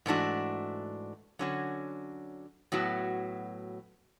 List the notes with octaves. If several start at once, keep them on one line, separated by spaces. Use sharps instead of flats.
G#2 E3 A3 D4 F#4
D3 F#3 C#4 F#4
A2 F#3 B3 F#4